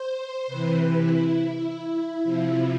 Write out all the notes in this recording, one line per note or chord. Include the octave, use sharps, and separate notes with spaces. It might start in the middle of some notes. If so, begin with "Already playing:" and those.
Already playing: C5
C3 E3 B4
E4
C3 F3